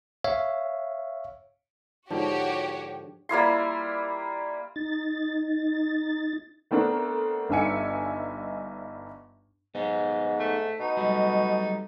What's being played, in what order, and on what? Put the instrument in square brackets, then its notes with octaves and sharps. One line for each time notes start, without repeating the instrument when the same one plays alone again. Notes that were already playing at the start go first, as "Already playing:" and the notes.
[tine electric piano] C#5 E5 F5
[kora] G#2 D3 F3 [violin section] F#4 G4 C#5
[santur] G3 A#3 E4 C6
[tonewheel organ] D#4 A6
[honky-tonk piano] A3 B3 C4 D4 A#4
G1 G2 D#4 E5 G#5 C#7
[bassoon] G#2 [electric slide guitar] B3 D#4
[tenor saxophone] A3
[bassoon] B2 [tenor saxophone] D#4
[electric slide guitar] F#3 G3 A3